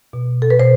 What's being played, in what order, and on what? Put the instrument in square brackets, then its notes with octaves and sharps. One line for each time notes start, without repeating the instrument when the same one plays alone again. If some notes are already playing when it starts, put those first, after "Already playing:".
[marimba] B2
A4
B4
B2 C5